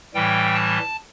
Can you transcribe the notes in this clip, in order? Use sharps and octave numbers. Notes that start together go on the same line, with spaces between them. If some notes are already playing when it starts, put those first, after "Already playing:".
A2 E3 G3 G5
A5